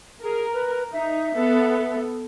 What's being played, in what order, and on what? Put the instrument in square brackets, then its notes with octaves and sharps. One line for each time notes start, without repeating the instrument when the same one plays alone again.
[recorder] G#4 [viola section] A#4
[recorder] B4
[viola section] D#4 [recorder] E5
[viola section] B3 A4